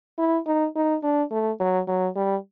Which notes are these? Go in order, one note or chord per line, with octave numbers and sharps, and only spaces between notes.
E4
D#4
D#4
D4
A3
F#3
F#3
G3